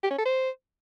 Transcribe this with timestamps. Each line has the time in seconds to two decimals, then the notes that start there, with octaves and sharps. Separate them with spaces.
0.03 G4
0.11 C#4
0.18 A4
0.25 C5